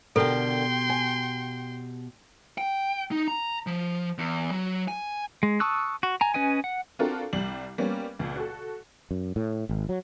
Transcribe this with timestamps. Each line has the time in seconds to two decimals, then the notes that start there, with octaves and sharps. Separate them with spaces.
0.16 B2 D3 G4 A4 A#4 G5 C6
0.90 G#5
2.58 G5
3.12 D#4
3.28 A#5
3.67 F3
4.18 E2
4.51 F#3
4.88 G#5
5.43 G#3
5.60 A5 C#6 D#6 E6 F#6
6.03 F#4
6.21 G#5 A#5
6.34 C#4 B4 D#5 G#5
6.64 F#5
6.99 C4 D4 F4 F#4 A4 A#4
7.33 C2 G3 F#7
7.78 G3 A#3 B3 C#4
8.19 C#2 A#2
8.36 F#4 A4
9.11 F#2
9.36 A2
9.69 G#1
9.89 F#3